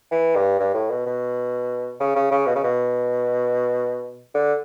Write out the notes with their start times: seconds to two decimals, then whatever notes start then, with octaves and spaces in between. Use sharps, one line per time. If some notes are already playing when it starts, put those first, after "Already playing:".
0.12 E3
0.36 G2
0.59 G2
0.74 A2
0.90 B2
1.06 B2
2.00 C#3
2.16 C#3
2.31 C#3
2.46 B2
2.55 C#3
2.64 B2
4.34 D3